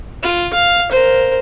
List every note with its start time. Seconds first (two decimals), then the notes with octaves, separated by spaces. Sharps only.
0.23 F4
0.53 F5
0.91 A#4 C5